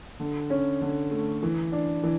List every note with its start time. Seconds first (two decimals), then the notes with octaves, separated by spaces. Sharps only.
0.20 D3
0.50 C#4
0.81 D3
1.11 A3
1.43 E3
1.72 D4
2.03 E3